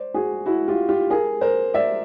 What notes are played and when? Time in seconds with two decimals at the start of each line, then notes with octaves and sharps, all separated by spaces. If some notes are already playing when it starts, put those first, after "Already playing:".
Already playing: C5 D5
0.14 F#4 G#4
0.46 E4 F#4
0.68 F4 G4
0.89 F4 G4
1.10 G#4 A#4
1.41 A#4 C5
1.74 D5 E5